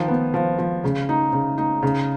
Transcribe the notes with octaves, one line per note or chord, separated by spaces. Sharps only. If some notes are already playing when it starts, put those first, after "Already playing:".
Already playing: D#3 F3
B3
F3
F3
C#3
D#4
C#3
D#4
C#3